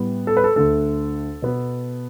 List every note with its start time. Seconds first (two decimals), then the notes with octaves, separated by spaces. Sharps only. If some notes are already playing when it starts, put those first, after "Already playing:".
Already playing: A2 G3 B3
0.27 A4
0.37 B4
0.44 A4
0.56 D2 D3 A3 A4
1.42 B2 B3